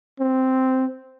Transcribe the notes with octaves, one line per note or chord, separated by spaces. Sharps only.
C4